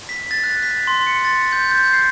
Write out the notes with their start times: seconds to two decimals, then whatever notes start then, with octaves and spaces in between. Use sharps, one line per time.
0.09 B6
0.31 A6
0.44 F#6
0.63 B6
0.87 C6
1.07 C#7
1.25 A6
1.52 G6
1.72 G6
1.93 C7